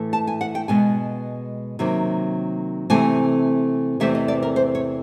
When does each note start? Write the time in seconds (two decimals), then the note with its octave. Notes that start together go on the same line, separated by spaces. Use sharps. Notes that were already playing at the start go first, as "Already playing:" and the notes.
Already playing: A2 E3 A3
0.13 A5
0.27 G#5
0.41 F#5
0.55 G5
0.68 B2 G#3 B3 G#5
1.79 C3 D#3 F#3 A#3
2.90 C3 E3 A3 C4 G#5
4.00 E2 C3 E3 A3 C4 E5
4.15 D#5
4.28 D5
4.43 A#4
4.56 C5
4.75 C#5